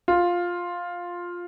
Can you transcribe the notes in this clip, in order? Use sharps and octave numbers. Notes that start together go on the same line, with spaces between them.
F4